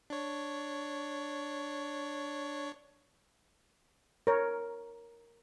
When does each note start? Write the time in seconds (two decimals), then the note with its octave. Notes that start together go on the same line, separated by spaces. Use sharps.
0.10 D4 C#5
4.27 A#4 C#5